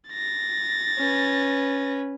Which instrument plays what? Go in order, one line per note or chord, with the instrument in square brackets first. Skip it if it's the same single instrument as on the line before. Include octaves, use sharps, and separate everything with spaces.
[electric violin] A6 A#6
[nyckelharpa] C#4 B4